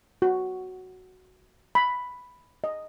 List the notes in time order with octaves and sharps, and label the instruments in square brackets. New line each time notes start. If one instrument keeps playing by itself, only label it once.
[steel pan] F#4
B5
D#5